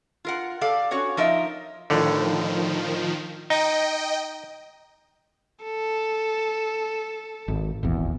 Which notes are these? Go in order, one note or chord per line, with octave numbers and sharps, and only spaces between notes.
F4 A#4 F#5
G4 A4 D5 F5
C#4 F#4 C#5 F#5
F3 D#4 A#4 D#5 E5
A2 D3 D#3 F3
D#4 D#5 G5
A4
G#1
D#1 G#1 E2